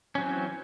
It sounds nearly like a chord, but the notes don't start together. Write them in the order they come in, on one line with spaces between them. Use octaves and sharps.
C#4 F#3 C4 E3